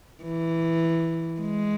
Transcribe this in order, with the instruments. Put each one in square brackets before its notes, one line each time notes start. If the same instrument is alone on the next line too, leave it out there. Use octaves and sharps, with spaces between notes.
[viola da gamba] E3
G#3